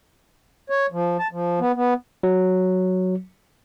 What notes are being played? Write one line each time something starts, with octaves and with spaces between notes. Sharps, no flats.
C#5
F3
A5
F3
B3
B3
F#3